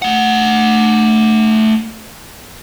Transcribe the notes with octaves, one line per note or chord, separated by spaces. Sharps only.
A3 F#5